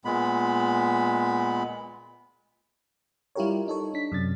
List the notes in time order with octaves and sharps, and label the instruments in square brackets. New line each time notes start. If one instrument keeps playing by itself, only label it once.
[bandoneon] A#2 G#3 B3 B5
[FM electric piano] G3 E4 F4 G4 A#4 C#5
D#4 A4 C#5
D4 B6
F#2 C3 A6